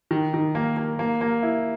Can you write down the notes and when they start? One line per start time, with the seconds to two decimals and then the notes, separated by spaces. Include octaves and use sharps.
0.11 D#3
0.34 D#3
0.55 A#3
0.76 A#3
0.99 A#3
1.21 A#3
1.43 E4